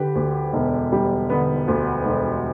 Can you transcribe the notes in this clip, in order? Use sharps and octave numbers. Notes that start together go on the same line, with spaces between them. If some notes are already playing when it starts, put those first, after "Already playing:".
Already playing: D3 G4 B4
D2
E1
G3
D3 B3
D2
E1